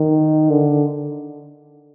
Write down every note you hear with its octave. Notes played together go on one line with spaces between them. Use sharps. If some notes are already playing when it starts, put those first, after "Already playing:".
Already playing: D#3
D3